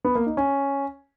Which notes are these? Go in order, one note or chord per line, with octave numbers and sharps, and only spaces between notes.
B3
A#3
D#4
C#4